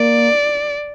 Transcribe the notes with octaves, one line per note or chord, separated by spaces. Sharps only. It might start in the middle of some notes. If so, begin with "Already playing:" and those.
Already playing: A#3 D5